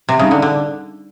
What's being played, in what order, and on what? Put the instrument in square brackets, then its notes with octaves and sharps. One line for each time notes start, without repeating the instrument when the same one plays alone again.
[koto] C3
[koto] C#3 [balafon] G3 C4 D#4
[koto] D3
D3